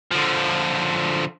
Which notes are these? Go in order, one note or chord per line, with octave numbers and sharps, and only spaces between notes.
D3 F3